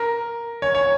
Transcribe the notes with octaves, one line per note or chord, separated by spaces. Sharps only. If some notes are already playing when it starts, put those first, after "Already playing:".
Already playing: A#4
C#5
C#5